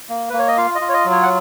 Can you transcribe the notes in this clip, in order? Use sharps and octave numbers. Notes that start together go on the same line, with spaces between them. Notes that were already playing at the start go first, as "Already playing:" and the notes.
A#3
A#3 B4
C#5
D#5
F4 F5
D#5
F4
C#5
D#5
F#3
C#5
F#5